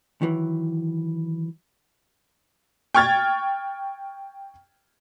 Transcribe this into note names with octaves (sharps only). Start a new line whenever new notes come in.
D#3 E3 F#3
G5 C#6 F6 G#6 A6